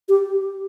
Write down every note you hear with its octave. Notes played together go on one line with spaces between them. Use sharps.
G4